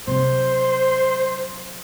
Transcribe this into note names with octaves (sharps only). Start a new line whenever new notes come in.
C3 F#3 C5